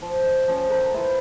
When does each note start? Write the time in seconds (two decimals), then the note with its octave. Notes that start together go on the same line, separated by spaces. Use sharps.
0.02 F3
0.22 C5 D#5
0.48 F3 C#4
0.69 A4 A#4 C5 G5
0.94 E4 F4 B4 C5